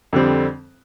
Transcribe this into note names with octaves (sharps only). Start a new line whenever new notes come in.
F2 D3 G3 C4